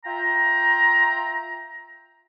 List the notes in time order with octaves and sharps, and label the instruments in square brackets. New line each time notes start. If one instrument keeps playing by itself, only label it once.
[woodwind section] F4 E5 G5 A#5